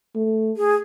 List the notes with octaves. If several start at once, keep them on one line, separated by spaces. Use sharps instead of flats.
A3
G#4